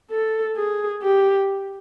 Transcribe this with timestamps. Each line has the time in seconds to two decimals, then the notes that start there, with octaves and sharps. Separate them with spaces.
0.11 A4
0.56 G#4
1.03 G4